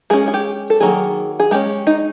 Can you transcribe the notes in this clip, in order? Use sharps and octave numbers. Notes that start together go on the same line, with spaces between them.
G#3 C#4 G#4
G#4
G4
A4
D#3 F#3 A#3 G#4
G#4
G#3 C#4 G4
D#4